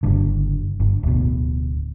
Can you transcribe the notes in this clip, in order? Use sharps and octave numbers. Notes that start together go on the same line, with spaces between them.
F#1 G2 D3
G1
D1 B2